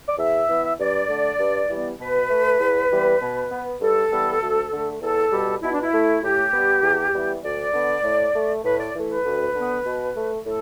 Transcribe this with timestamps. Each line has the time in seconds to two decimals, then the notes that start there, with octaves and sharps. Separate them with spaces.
0.09 D5
0.18 E2 E5
0.49 E3 B3
0.79 G2 D5
1.09 D3 A3
1.39 G2
1.69 E3 G3 B3
1.99 B2 B4
2.30 A3
2.60 E2
2.91 E3 G3 B3
3.21 B2
3.52 B3
3.81 G2 A4
4.12 E3 G3 B3
4.41 D2
4.72 D3 A3
5.01 E2 A4
5.32 B2 G3
5.62 B2 E4
5.73 D4
5.82 E4
5.93 A3
6.23 A2 G4
6.54 G3 B3
6.83 E2
7.14 E3 G3 B3
7.44 D2 D5
7.73 D3 B3
8.04 A2
8.35 A3
8.64 A2 B4
8.79 D5
8.94 E3 A3
9.09 B4
9.25 D2
9.55 D3 B3
9.85 B2
10.16 A3
10.46 A2 A4